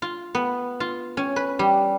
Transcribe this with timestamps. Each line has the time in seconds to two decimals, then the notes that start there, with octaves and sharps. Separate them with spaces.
0.02 F4
0.35 B3
0.80 F4
1.17 C#4
1.36 B4
1.59 G3